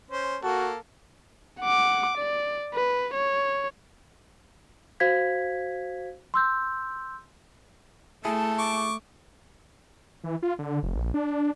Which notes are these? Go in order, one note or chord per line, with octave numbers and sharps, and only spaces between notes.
C#4 C5
A#3 F#4 A4 A5
F#5 D6
D5
B4
C#5
F#4 C5 F5 G#6 B6
C6 E6 G6
A3 E4 G#4 A5
C#6 D6
E3
F4
D3
F1
A#1
D4